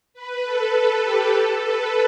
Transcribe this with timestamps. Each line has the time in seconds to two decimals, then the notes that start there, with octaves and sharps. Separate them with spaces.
0.14 B4
0.44 A4
0.74 A4
1.03 G4
1.33 A4
1.63 B4